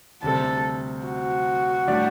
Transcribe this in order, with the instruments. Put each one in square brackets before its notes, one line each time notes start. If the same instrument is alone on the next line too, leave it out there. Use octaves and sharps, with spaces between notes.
[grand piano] D2 C3 G3 C4 [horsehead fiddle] A4
[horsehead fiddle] F#4
[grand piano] A2 G3 D4 G4 D5